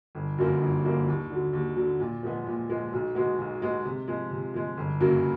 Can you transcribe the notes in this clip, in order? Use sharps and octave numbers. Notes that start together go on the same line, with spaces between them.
G1
F#2 D3 F3 A#3
G1
F#2 D3 F3 A#3
D#2
D3 F#3
D#2
D3 F#3
A#2
F3 G#3 B3
A#2
F3 G#3 B3
B1
B2 G#3 B3
B1
B2 G#3 B3
C3
F3 G#3
C3
F3 G#3
G1
F#2 C#3 F#3 A#3